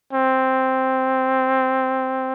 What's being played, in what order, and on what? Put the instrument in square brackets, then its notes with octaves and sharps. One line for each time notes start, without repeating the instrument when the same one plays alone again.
[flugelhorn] C4